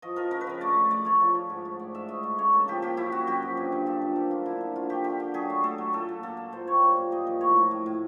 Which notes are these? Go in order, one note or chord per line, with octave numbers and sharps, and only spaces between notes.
F3 D#5
F3 A#4
C#3 A#4
B4
F3 A#4
A3 D5
A3
A3 D5
A3 C#5
F3
F3
G#2
A3
G#2 D5
G#2 E5
A3 D#5
A3
C#3 C#5
A#3 A4
F3 G4
A#3 G4
F#2 E4
F#2 F#4
F#2 G4
F3
G2
G2
G2 A4
F3
A#3 A#4
D3 F4
D3 E4
F3
D3 F4
D3 G4
D3 G4
D3
F#3 G#4
A3
A3 A4
F#3
A#2 A4
A#2
A#3 A4
A#3
A#2 C5
G3 C#5
A#3 C5
A#2
A#3 D#5
F3
A2 C#5
F3
A2
A2